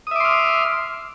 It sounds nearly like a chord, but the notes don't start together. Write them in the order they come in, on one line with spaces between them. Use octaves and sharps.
D#6 E5 D6 C6 F6